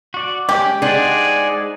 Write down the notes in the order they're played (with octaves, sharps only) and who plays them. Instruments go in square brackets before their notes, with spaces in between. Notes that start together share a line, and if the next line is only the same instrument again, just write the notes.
[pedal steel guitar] F#4 D5
[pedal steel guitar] G#3 C#4 D5 [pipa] G4
[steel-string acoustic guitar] G#3 D4 [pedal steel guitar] D#4 C5 F#5 [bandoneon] G#4 D5 G#5